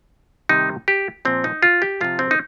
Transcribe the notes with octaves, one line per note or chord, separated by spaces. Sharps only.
C3 D#3 G3 D#4
G4
A#2 F3 C4
D#4
F4
G4
C3 F3 F4
C4
D#4